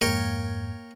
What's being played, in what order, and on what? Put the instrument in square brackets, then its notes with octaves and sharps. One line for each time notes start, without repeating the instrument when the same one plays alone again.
[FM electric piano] F2 G#2 G#6 [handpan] A#3 [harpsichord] A#4 C#5 G5